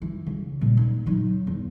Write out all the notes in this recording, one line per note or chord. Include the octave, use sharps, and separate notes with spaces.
E3
C#3
A#2
D#1
F#3 D#4
E2